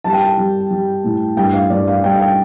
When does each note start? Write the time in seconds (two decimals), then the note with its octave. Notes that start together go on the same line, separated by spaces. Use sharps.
0.04 G3 A5
0.13 G5
0.21 A5
0.38 G3
0.71 G3
1.04 A2
1.37 G2 G5
1.53 F5
1.70 G2 D5
1.87 F5
2.04 G2 G5
2.14 F5
2.20 G5